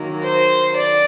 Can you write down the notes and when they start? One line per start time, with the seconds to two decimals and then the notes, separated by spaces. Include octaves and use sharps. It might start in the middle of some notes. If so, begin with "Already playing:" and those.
Already playing: D#3 F#3 A#3
0.24 C5
0.76 D5